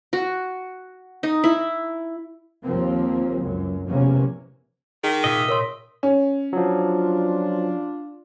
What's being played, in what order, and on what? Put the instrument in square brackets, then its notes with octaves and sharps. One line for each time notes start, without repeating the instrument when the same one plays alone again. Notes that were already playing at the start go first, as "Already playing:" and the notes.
[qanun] F#4
D#4
E4
[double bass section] D#2 F3 A#3 C4
C#2 F#2
F1 B1 E2 C3 A#3 C#4
[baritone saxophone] D#3 [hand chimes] G#4 B6
[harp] A#2 [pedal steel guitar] D#5 E5
[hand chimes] A#4 C#5 C6
[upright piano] C#4
[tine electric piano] F3 F#3 [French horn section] D4 F4